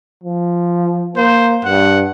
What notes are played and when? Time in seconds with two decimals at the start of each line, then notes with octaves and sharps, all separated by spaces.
0.23 F3
1.16 A#3 C5
1.65 G2 F#5